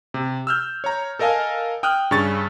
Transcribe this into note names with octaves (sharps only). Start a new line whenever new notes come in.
C3
E6 F6 G6
C#5 A#5
A4 A#4 D#5 F5 G#5 A5
G5 D#6 F6 F#6
G2 C#3 C#4 C#6 A6